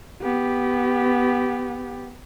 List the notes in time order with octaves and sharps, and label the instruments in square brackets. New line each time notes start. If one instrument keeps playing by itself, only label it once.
[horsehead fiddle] B3 G4